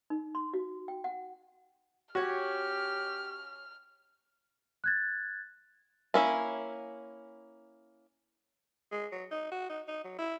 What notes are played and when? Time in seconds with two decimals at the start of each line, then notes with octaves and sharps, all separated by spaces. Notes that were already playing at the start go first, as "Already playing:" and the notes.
0.10 D#4
0.35 C6
0.54 F#4
0.88 G5
1.04 F#5
2.15 C#4 F#4 G4 C#5 F6
4.84 F#6 G#6 A6
6.14 A#3 C#4 E4
8.92 G#3
9.12 F#3
9.31 D#4
9.51 F#4
9.70 D#4
9.88 D#4
10.04 F#3
10.19 E4